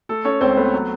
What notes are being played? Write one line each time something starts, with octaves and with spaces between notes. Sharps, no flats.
A3 A4
A3 C#4 C#5
C#2 C4 C5
A3 B3 B4
F#3